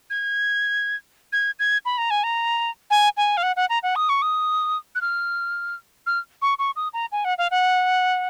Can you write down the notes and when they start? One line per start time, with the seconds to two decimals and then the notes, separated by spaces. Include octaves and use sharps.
0.10 G#6
1.32 G#6
1.59 G#6
1.85 B5
1.98 A#5
2.10 G#5
2.23 A#5
2.90 G#5
3.17 G#5
3.37 F5
3.43 F#5
3.56 F#5
3.69 A#5
3.83 F#5
3.96 D#6
4.09 C#6
4.22 D#6
4.95 F#6
5.01 F6
6.06 F6
6.42 C#6
6.59 C#6
6.76 D#6
6.93 A#5
7.12 G#5
7.24 F#5
7.38 F5
7.51 F#5